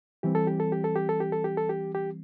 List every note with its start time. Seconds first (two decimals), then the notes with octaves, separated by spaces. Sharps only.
0.23 E3 G3 C4 G4
0.35 A4
0.47 G4
0.60 A4
0.72 G4
0.84 A4
0.96 G4
1.09 A4
1.20 G4
1.32 A4
1.44 G4
1.57 A4
1.69 G4
1.95 G4